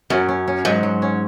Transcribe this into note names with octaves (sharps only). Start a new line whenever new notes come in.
F#2 C#4
C#4
C#4
G#2 F#3
F#3
C#4